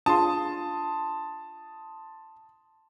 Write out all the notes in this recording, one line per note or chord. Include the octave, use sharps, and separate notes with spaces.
D4 F4 G#4 A5 C6 D#6